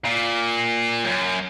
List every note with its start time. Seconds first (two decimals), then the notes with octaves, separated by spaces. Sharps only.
0.05 A#2
1.04 F#2